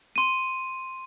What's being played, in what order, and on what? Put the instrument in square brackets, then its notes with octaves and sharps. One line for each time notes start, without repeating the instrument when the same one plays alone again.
[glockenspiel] C6 D#7